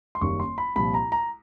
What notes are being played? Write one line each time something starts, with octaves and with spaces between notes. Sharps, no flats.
C6
F#1 F#2 D#3 G3 A#3 C#6
C6
B5
C2 A#2 F3 B5
A#5
A#5